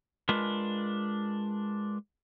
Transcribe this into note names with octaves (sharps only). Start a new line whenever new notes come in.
G#3 D4 F4 A#4 B4